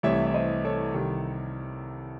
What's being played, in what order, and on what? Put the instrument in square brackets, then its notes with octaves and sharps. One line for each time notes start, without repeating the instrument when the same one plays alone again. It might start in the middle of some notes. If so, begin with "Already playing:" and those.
[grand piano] C2 C3 E3 A3 C#5 E5
E5
C5 D#5
A4 C#5
C2 C3 D#3